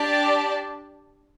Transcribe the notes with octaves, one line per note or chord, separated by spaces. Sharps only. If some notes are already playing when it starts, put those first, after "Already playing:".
Already playing: D4 G4 D5 A5